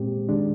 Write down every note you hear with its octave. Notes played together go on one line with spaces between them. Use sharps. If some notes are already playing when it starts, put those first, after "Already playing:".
Already playing: A#2 G#3 C4 G4
D#3 G#3 D4